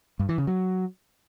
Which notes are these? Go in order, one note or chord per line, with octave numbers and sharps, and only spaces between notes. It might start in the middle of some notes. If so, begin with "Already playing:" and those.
G2
E3
C#3
F#3